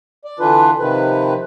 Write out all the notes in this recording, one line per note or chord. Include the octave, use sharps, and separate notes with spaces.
D5
D3 E3 D4 F4 B4
C3 D#3 F3 B4